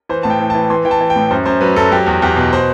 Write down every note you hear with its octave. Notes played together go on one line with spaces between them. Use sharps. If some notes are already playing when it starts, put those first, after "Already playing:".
E3 C5
A2 A5
G5
E3
A5
E3
E3 C6
E3 G5
A5
E3
G5
A2
F#2 C5
F#2 C5
F#3 B4
F#2 A4
F#3 G4
E2
E2 G4
B2
C5